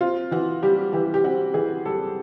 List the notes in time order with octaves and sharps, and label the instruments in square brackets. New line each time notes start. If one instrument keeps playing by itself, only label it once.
[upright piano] C4 F4
E3 F#4
G3 G4
E3 G4
G4
C4 F#4
E3 G#4
G3 A4